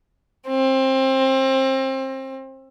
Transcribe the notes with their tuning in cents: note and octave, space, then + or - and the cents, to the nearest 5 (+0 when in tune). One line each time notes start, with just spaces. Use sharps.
C4 +25